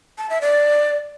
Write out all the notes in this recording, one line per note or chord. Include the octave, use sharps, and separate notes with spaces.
A5
E5
D5